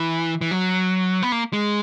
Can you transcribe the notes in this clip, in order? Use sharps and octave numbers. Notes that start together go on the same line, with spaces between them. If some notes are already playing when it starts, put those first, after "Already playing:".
Already playing: E3
E3
F#3
B3
A#3
G#3